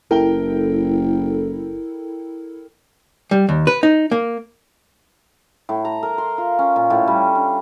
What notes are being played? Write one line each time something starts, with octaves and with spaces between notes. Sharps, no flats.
F#1 E4 A4 A#4 G5 G7
G3
D#2
B4
D#4
A#3
A2
A#5
A#4
C6
F4
C#4
A#2
A2
G3
D4